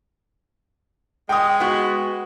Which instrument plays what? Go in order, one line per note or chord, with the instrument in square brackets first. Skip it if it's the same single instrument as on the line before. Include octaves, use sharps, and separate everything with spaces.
[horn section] G#3 [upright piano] G5 D#6
[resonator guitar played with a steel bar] B3 F#4